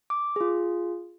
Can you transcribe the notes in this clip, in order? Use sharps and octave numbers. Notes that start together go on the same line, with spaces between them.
D6
F4 G#4